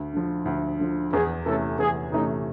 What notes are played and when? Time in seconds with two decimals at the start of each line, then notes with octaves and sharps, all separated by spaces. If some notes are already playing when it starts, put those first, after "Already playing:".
Already playing: D2
0.13 D3 F3
0.45 D2
0.79 D3 F3
1.12 E2 G#4
1.45 C3 E3 A3 C#4 A4
1.79 E2 G#4
2.12 C3 E3 A3 C#4 D#4